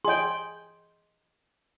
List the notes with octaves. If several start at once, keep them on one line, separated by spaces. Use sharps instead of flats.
G#4 D#5 G5 C6